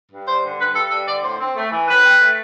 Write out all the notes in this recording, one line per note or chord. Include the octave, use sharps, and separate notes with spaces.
G2
G3 C5
D3
G2 B4
G2 A4
G3 A4
D3 D5
A2 C5
C4
A3
E3
A2 B4
C4
A3